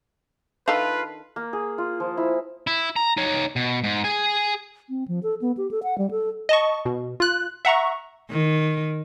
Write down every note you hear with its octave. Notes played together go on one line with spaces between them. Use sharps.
D#3 D4 F4 A4 B4
A#3
G#4
F4
F3
E4
E4
A#5
D#4 C#5
B2
G#2
G#4 G#5
C4
F3
A4
B3
G4
A4
F#5
G3
A4
D#5 A5 C#6
B2
F4 F#6
E5 F#5 A#5 C#6
D#3